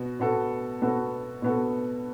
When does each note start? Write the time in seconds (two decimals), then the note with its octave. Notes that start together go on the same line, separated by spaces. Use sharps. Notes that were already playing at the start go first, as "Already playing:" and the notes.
Already playing: B2 B3 F#4
0.20 B2 B3 F#4 A4
0.82 B2 B3 F#4 A4
1.42 B2 B3 F#4 A4